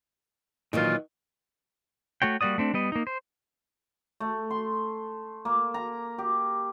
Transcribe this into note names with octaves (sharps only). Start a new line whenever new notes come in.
A#2 D#3 E3 F#3 F4
A3 F#4 C#5 G5
G3 A#3 F#4 D5 D#6
A3 C4 D4
G3 B3 D#5
A#3 D#4
C5
A3
C6
A#3
A#5
G4